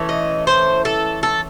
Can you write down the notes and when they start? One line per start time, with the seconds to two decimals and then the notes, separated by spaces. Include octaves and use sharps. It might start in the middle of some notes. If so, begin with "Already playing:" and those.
Already playing: E3 A3 C#4
0.09 D#5
0.47 C5
0.85 A4
1.23 A4